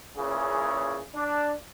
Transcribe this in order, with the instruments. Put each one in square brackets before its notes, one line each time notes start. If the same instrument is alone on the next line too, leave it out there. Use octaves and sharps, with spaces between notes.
[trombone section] A#2 C#3 E3 C#4 G#4
D4